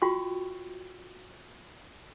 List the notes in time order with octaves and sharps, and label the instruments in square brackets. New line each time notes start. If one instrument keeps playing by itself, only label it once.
[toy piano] F4 F#4 G5 C#6